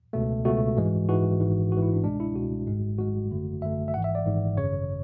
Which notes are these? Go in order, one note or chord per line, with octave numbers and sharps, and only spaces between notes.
C#2 B2 A3
C#2 B2 A3 F#4
G#2 E3 G#3
G#2 E3 G#3 F#4
G#1 G#2 E3
G#1 G#2 E3 F#4
E4
D4
C#2 B2 G#3 D4
E4
C#2 B2 G#3 F#4
G#1 G#2 G#3
G#1 G#2 G#3 F#4
G#1 F#2 D3 A3
G#1 F#2 D3 A3 E5
E5
G#1 G#2 E3 F#5
E5
D5
G#1 G#2 E3
G#1 F#2 C#3 C#5